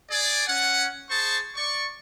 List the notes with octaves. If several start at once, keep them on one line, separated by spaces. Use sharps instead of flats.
G#4 D5
C#4 F#5
G#4 C5 A5 C#6
D5 C#6